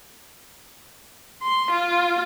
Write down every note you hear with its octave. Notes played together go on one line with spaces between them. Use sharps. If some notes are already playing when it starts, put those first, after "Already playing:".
C6
F4